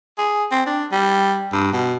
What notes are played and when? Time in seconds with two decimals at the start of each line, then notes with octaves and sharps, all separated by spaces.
0.18 G#4
0.51 C4
0.66 D4
0.92 G3
1.53 G2
1.73 B2